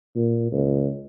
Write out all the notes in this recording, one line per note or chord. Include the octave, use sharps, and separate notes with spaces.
A#2
C#2